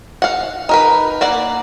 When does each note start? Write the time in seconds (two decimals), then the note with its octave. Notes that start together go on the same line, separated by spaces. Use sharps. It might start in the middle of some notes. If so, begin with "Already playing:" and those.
0.22 F5 F#5
0.69 D#4 A#4 B4
1.21 A#3 D5 F#5